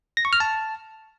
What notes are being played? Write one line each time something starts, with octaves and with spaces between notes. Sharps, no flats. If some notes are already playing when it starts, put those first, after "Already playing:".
A#6
C#6
F6
A5